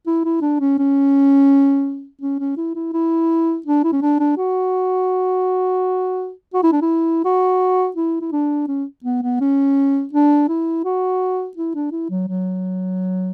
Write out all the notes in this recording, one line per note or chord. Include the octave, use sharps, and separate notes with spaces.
E4
E4
D4
C#4
C#4
C#4
C#4
E4
E4
E4
D4
E4
C#4
D4
D4
F#4
F#4
E4
D4
E4
F#4
E4
E4
D4
C#4
B3
B3
C#4
D4
E4
F#4
E4
D4
E4
F#3
F#3